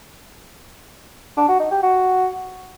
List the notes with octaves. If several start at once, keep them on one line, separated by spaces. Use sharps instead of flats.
D4
F#4
D#4
G4
F#4